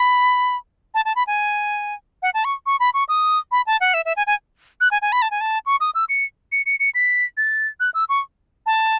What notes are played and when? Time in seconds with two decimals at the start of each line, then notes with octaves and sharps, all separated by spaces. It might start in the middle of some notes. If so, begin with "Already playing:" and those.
Already playing: B5
0.94 A5
1.05 A5
1.16 B5
1.27 G#5
2.22 F#5
2.34 A5
2.44 C#6
2.66 C#6
2.80 B5
2.94 C#6
3.09 D#6
3.51 B5
3.66 A5
3.81 F#5
3.94 E5
4.05 E5
4.16 G#5
4.27 G#5
4.81 F#6
4.91 G#5
5.02 G#5
5.12 B5
5.22 A5
5.31 G#5
5.41 A5
5.66 C#6
5.80 D#6
5.95 E6
6.09 C#7
6.52 C#7
6.66 C#7
6.80 C#7
6.95 B6
7.37 A6
7.80 F#6
7.94 E6
8.09 C#6
8.66 A5